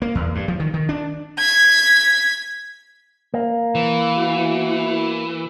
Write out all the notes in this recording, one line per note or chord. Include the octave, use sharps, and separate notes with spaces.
A#3
E2
G2
F3
D#3
D#3
D4
G#6 B6
A#3
E3
B3 E4 F#4